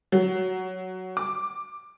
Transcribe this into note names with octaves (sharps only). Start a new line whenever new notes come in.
F#3
D6